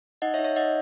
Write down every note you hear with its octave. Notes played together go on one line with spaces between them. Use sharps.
D#4 D#5 F#5
C#5 E5
D#4
C#5 E5
D#4 D#5 F#5